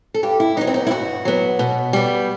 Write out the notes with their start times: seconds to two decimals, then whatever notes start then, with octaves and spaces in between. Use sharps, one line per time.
0.14 A4
0.23 G2 G4
0.40 E4
0.57 F#3 B3 D#4
0.67 C4
0.74 D#4
0.87 E4
0.91 G2 F#4
1.25 F#3 B3
1.59 B2
1.93 G3 B3